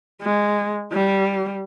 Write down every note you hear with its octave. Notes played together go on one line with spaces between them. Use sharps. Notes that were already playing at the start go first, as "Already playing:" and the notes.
G#3
G3